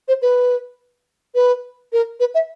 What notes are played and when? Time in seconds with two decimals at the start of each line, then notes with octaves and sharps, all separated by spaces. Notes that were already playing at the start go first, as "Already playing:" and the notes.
0.08 C5
0.22 B4
1.35 B4
1.93 A#4
2.20 B4
2.35 E5